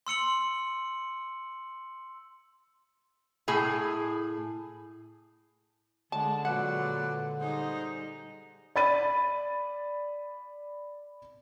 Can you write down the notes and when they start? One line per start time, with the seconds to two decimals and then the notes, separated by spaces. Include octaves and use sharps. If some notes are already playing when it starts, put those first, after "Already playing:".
0.07 C6 E6 C#7 F#7
3.48 A2 E4 G#4 G#5
6.12 D3 G#3 D4 A5
6.45 A#2 F#3 G#3 B4 D5 F#5
7.41 G3 D#4 G#4 C5
8.76 D5 B5 A6 D#7